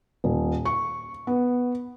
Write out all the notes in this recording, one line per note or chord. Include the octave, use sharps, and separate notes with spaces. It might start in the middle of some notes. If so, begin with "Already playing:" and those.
D#1
C#6
B3